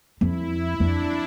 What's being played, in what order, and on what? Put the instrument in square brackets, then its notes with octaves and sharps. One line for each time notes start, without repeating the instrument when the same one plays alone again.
[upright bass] F2 [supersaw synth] E4
[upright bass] F2 [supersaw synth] D4